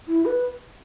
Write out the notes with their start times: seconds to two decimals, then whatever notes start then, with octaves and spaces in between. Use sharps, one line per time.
0.08 E4
0.26 B4